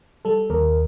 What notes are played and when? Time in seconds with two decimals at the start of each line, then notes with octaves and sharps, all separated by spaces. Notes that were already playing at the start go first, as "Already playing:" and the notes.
0.25 G3 A4
0.50 D#2 A#4